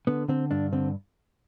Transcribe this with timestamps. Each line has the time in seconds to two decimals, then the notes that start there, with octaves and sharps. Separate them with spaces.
0.07 D3 B3
0.28 D3 C4
0.51 G2 D4
0.73 D3 C4